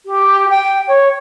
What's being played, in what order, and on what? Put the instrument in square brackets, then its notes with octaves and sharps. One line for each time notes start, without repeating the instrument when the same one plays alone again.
[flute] G4
G5
C#5